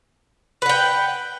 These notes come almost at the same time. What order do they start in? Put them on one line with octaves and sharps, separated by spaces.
B4 F#5 G5